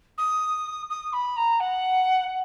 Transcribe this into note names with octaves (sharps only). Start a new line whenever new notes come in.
D#6
D#6
B5
A#5
F#5